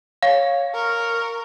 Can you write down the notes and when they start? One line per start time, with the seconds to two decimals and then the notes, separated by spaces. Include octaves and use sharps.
0.23 C#5 F5
0.75 A#4 C#6